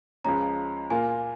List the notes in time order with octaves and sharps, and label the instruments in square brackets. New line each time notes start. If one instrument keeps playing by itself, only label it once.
[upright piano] C#2 C#3 F3 G#3 C#4 [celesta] A#5
[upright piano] A#2 A#3 F4 A#4 [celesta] G#5